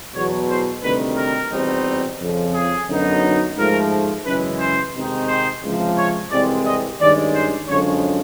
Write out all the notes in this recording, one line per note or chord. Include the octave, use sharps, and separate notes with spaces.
E2 B2 F#3 C#5
C5
D2 C3 D#3 G3 B4
A#4
E2 B2 G3 C4 D#4
F2 C#3 F3
G#4
F#2 D3 F#3 B3 D#4
G#2 F3 A3 A#4
F#2 C#3 E3 G#3 B4
C5
C3 D#3 G#3 C4 D#4
C5
C#2 C3 F3
C#5
C2 C3 E3 G#3 C4 D5
D#5
G2 D#3 G#3 C#4 D5
C5
F#2 D3 F3 G#3 C#5